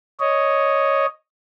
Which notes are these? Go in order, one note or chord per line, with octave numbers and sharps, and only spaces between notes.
C#5 D#5